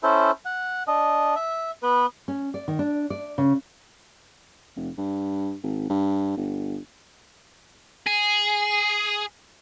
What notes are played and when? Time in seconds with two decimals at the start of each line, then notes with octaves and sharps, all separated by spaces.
0.03 C#4 E4 A4 C5
0.45 F#5
0.88 D4 D#5
1.36 E5
1.83 B3 B4
2.28 C#4
2.54 D5
2.68 D#3
2.79 D4
3.10 D5
3.38 C#3
4.76 F1
4.98 G2
5.64 G#1
5.90 G2
6.37 G1
8.06 G#4